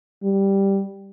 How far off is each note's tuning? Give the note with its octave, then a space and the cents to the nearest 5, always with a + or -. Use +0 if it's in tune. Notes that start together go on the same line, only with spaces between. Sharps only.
G3 +0